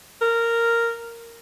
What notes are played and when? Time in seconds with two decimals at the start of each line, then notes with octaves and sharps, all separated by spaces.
0.21 A#4